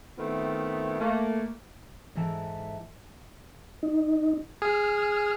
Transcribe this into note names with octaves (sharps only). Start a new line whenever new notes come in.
D#3 A3 B3 C4 E4 F4
A3 A#3
G#2 E3 A4 E5
D#4
G#4 F6